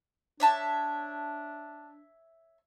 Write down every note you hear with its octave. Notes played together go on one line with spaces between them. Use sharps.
D4 C#5 E5 A5